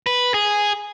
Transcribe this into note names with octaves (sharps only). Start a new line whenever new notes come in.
B4
G#4